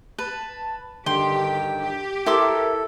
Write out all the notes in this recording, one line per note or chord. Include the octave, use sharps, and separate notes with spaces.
B4 A5
G2 D3 D#3 G4 G5 C6
G4
E4 A4 A#4 C6 D6